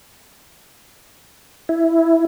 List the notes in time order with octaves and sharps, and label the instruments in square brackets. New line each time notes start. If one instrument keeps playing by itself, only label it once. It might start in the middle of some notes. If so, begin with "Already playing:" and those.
[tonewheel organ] E4